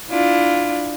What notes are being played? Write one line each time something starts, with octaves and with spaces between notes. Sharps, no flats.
D4 E4 F4